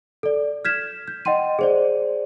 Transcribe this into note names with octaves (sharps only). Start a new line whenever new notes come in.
A4 D5
F6 G6 G#6 B6 E7
G6
D#5 F#5 G5 C6 D#7
G#4 C5 D5